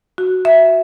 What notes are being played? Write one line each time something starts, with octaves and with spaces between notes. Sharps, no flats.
F#4
E5